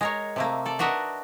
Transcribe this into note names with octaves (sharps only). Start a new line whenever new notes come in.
G#3 A#4 C#5
C3 A3 A#3
A4 D5
D4 F#4 A#4 B4 D#5 E5